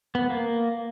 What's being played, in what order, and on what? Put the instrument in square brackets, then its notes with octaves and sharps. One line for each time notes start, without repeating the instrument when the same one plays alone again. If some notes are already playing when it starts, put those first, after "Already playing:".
[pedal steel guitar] B3
A#3